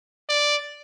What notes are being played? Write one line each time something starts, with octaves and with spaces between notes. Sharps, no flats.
D5